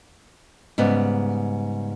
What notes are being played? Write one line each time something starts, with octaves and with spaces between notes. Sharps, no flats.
G#2 C#3 G3 B3